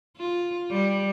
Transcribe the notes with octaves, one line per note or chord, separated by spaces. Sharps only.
F4
G3